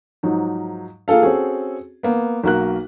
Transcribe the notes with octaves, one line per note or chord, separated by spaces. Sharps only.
G#2 F3 F#3 D#4
A#3 F4 G#4 A4 F5
C4 C#4 F#4 G#4 A4
A#3 B3
B1 A#3 F#4 A#4 F#6